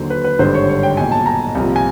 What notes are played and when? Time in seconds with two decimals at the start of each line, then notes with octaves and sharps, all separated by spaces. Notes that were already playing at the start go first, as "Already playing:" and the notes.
Already playing: D#2 D3 F#3 C5
0.10 B4
0.24 B4
0.39 G#1 G2 D3 C5
0.54 C#5
0.69 C#5
0.83 G5
0.97 B1 A#2 F#3 G#5
1.12 A5
1.26 A#5
1.55 C2 A#2 F3
1.76 G#5